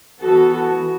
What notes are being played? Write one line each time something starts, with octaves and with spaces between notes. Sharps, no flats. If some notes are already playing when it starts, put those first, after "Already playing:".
E3 B3 F#4 A4
F#4